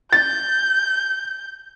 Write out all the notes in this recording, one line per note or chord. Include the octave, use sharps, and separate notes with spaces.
G6 A6